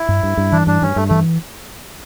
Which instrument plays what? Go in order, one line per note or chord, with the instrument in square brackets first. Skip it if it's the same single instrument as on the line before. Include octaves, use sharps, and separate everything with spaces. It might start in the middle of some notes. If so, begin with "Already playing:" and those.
Already playing: [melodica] E4
[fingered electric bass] G2
G2
G2
[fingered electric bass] E3 [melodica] D4
[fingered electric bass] G2 [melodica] D4
[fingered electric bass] G2 [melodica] C#4
[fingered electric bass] G2 [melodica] A3
[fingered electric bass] E3 [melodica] A3